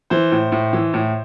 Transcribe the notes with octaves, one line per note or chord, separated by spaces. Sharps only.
E3 C5
A2
A2
E3
A2